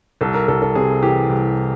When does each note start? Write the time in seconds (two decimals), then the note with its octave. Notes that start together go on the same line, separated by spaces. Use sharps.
0.21 C2 A4
0.34 A#4
0.48 C2 A4
0.62 A4
0.75 C3 G#4
1.03 E3 G4
1.30 C2